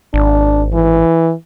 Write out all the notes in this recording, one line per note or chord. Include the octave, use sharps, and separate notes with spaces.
G#1 D4
E3